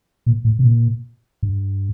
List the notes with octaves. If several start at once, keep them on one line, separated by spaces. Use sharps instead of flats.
A#2
A2
C3
A#2
G2